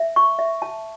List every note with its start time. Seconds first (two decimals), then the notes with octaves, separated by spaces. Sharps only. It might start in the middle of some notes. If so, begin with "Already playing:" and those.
Already playing: E5
0.16 C#6
0.39 E5
0.62 A5